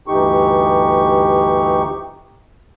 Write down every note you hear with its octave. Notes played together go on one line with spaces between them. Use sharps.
D2 G2 E3 D#4 G4 C#6